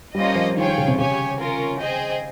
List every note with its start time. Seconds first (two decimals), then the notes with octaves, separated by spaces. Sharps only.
0.15 G3 A#3 C#4 F4 C5 D#5
0.35 F3
0.56 D#3 C#4 F4 G#4 C#5 G5
0.66 D#3
0.78 C#3
0.88 C3
0.98 C#3 G4 C#5 G#5
1.39 C#4 F4 A#4
1.80 G#4 C5 D#5 G5